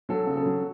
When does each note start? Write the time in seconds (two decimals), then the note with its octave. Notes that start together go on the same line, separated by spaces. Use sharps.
0.09 F#3 A4
0.27 C#3
0.37 A4
0.45 F#3